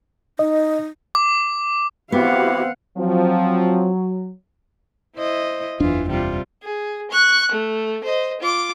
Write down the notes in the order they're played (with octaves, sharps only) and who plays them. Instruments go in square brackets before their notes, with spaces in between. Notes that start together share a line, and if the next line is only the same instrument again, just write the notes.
[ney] D#4 [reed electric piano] D#5
[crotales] D6
[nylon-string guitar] B3 [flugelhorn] C4 [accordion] E4 F#4 G4 [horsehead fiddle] F5 F#5
[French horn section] F3 C4 [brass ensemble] F#3
[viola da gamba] E4 C5 D#5
[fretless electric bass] F#1 E2 D4 [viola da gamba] E3 F4
[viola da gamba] C3 G3 F4
[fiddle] G#4
C#6 F#6
A3
C5 D#5
F4 D6